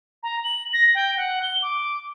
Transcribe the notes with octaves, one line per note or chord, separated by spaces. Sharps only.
A#5
F#7
A#6
G5
F#5
G7
D6